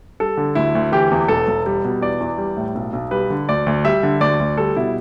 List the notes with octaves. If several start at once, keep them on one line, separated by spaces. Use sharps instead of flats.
G3 A4
D3
D2 E4
D2
E3 G4
E2
E1 A4
E1
G3
B2
E2 D5
E2
G3
A2
B1
B1
G3 B4
D3
D2 D5
D2
G3 E5
D3
D2 D5
D2
G3 A4
B2 E4